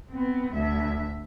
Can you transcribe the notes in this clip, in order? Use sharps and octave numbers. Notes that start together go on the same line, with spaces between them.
B3 C4
D2 E5